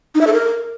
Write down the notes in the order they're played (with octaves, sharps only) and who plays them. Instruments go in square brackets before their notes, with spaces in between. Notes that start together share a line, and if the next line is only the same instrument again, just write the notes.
[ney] D#4
E5
A4
A#4